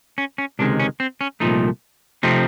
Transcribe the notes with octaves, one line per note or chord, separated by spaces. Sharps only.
C#4
C#4
C#2 C3 D#3 G#3 D4
C#4
C4
C#4
C2 A#2 F3 A3 D#4
C3 F3 A3 C4 D#4